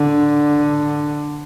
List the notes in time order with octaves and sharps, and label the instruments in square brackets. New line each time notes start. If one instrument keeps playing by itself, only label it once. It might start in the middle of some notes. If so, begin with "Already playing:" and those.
Already playing: [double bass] D3